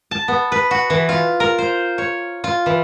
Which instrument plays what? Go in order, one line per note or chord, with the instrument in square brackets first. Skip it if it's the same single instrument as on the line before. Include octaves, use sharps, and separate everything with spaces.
[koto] A5
B3
B4
F#4
E3
F4
A#4
C5
C#5
F4
E3